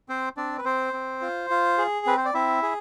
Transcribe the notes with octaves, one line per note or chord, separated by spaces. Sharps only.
C4 C5
C4 D4 D5
B4
C4 C5
C4
F4
F4
G#4
C4 B4
C5
D5
C4 E4 E5
G#4